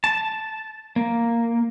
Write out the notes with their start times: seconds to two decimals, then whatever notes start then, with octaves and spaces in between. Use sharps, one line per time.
0.04 A5
0.96 A#3